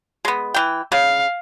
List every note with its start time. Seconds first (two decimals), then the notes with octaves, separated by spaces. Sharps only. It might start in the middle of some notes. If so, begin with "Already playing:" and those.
0.25 G#3 B3
0.54 E3 G5
0.92 C#3 F5